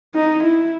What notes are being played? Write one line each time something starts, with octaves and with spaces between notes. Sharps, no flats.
D#4
E4